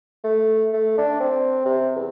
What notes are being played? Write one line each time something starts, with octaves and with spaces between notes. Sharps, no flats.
A3
A3
D4
C4
C3
E2